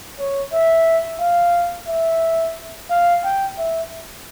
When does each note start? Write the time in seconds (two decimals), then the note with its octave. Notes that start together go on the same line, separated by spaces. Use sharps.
0.19 C#5
0.53 E5
1.21 F5
1.89 E5
2.91 F5
3.24 G5
3.58 E5